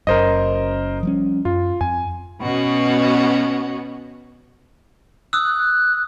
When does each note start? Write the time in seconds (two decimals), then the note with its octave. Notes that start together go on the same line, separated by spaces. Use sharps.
0.07 F#1 F#2 A#4 C5 D#5
1.03 F3 G3 C#4
1.45 F#2 F4
1.81 F2 G#5
2.41 B2 B3 C#4 F#4
5.33 D#6 E6 F#6